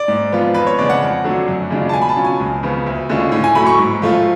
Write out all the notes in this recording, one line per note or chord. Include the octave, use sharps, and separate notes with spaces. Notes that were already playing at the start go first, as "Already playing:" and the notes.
Already playing: D5
G#2
F3 B3 F4
F2 B4
C#5
C#3 G#3 D5
F#5
F2
D3 F#3 A3 D4
F#2
C#3 G#3 D4 F4
A5
B2 G#5
B5
A5
F#3 C#4 F4
G#5
C#2
C#3 F3 B3
D2
D3 G#3 C#4 F4
A2
G#5
F#3 A3 B5
C#6
G#2
F3 A3 F4